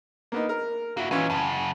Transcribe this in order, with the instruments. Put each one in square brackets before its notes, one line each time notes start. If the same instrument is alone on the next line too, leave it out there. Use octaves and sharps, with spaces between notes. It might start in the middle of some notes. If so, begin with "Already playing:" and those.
[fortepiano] A#3 B3 D#4
A#4
[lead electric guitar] A#3 E4 [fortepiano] F#4
[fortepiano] E3 C#4 [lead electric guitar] D#4 F4
[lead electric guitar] F#2 C#3 [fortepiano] G#5 A5